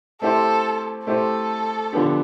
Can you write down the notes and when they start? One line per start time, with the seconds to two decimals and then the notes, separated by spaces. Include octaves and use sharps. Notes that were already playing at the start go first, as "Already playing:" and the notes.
0.21 A3 C4 E4 G4 A4 C5
1.07 A3 C4 E4 G4 A4 C5
1.93 D3 F3 B3 D4 G4